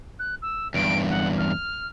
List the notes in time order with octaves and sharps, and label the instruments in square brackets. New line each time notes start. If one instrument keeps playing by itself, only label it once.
[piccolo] F#6
E6
[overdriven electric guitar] E2 G2 [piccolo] D7
[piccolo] F#5
F6